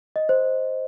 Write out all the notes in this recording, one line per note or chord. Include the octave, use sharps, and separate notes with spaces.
D#5
C5